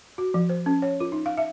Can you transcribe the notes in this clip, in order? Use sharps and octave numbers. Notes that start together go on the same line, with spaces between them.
F#4
F3
C5
C#4
C#5
F4
D#4
F5
E5